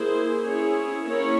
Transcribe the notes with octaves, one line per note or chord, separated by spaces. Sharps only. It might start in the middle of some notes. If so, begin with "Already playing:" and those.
Already playing: A#3 E4 G#4 C5
C#4 E4 G#4 C#5
A#3 C#4 E4 A#4 C#5